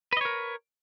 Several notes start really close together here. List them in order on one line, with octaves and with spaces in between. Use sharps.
B4 D#5 C#5 A#4